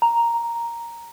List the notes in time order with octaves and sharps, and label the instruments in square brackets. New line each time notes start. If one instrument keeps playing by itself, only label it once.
[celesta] A#5